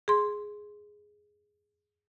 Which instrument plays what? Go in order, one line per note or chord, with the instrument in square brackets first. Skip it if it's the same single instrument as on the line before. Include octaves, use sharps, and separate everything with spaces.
[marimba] G#4 C6